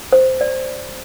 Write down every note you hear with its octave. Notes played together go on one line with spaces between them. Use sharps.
C5
D5